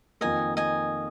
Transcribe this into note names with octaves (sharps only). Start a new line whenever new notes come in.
F2 D#3 A#3 F4 A#4 D#5 G#5
D#5 G#5